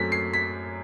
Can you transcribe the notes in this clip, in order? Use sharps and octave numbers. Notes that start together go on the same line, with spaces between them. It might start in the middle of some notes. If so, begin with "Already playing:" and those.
Already playing: F#2 F#3 A3 C4 B6
C7
B6